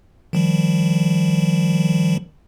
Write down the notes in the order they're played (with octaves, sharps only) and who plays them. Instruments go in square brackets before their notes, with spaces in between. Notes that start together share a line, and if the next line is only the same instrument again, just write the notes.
[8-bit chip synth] D#3 F3 G3